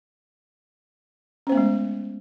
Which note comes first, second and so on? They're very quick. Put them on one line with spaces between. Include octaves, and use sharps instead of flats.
C#4 C5 B3 A3 G#3